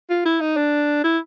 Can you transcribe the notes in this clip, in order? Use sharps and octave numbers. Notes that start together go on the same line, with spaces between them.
F4
E4
D#4
D4
E4